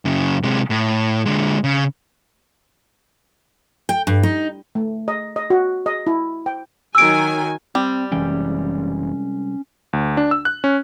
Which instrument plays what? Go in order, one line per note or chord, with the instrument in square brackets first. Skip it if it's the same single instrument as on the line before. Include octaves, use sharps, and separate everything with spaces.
[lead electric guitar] F#2 C#3
C3 G#3
A2
D3 G#3
C#3
[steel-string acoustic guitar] G5
G2
D#4
[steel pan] A3
D#5
D#5
F#4
D#5
E4
G5
[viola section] D#3 F#3 G#5 [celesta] E6 D7
[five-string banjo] G3 [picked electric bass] C4
[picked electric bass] F#1 E3 [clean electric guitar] C2 G#3 G5 [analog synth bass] C#4
[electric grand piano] D2
D4
E6
F#6
C#4